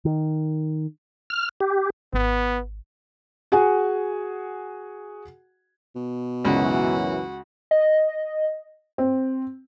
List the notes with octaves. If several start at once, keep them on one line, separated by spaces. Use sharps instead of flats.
D#3
F6
G4
G#1 B3
F#4 G#4 F#5 G#5
B2
C#2 F#2 E3 F#4
D#5
C4